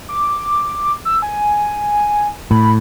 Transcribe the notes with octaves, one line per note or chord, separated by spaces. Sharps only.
D6
E6
G#5
A2 B5